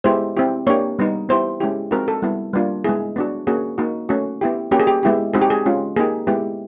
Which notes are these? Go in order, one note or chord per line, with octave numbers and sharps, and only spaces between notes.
G#3 B3 E4 G4 C5
C4 E4 G4
A#3 D4 G4 C#5
G3 B3 D#4
B3 E4 G4 C5
G#3 C#4 E4 G4
G#3 C4 D#4 F#4 A#4
A4
G3 B3 E4
G3 A#3 D4 F4
G#3 B3 E4 G#4
B3 D4 F#4
A#3 C#4 F#4 G#4
A#3 D#4 F#4
A3 C#4 F#4
B3 E4 G4
A#3 C#4 F#4 G4
G#4
G4
G#3 B3 E4 G4
G#3 C4 D#4 F#4 G#4
G4
G#4
G#3 C#4 F4
A#3 D#4 G4 G#4
G#3 B3 E4 G4